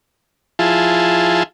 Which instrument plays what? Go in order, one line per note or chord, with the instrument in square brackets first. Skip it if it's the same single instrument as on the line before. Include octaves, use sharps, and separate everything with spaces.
[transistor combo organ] F3 E4 F4 G#4 A5